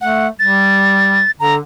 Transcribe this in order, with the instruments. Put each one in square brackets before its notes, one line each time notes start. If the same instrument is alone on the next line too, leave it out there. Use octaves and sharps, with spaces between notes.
[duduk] A3 [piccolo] F#5
[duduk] G3 [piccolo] A6
[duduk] D3 [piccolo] A#5